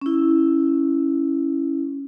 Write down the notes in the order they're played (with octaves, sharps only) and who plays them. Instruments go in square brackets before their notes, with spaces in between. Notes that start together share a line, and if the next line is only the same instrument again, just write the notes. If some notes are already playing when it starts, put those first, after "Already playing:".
[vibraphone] C#4 E4